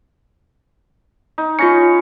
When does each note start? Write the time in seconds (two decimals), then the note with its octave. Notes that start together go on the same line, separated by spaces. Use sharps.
1.38 D#4
1.59 C#4 F4 C#5 A#6 C#7